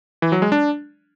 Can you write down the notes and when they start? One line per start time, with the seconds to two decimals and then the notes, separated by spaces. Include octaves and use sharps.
0.22 E3
0.32 F#3
0.42 G#3
0.52 D4